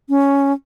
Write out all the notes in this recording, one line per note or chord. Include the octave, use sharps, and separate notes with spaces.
C#4